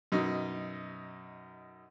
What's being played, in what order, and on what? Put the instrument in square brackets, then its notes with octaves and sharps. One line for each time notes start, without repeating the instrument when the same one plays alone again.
[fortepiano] F#2 B2 D#4